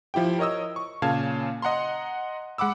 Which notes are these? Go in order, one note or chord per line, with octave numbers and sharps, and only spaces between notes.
F3 E4 G4 G5
A#4 C#5 D#5 D#6 E6
C#6
A#2 C#3 C#4 F5 A5 G#6
D#5 F#5 A#5 C6
G#3 F#5 B5 D6 E6